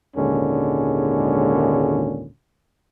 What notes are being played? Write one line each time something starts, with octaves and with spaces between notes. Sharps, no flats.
G#1 D#2 A#2 D3 G#3 C#4